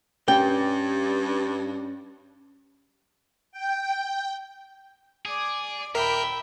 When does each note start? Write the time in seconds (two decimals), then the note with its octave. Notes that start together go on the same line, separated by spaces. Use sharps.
0.28 G2 C#4 G5
3.52 G5
5.25 G#4 D5 D6
5.95 D#2 A#2 A#4 E5 G5 B5